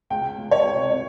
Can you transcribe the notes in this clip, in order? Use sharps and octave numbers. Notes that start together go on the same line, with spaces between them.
C#2 G5
C#2
C#5
C3
C3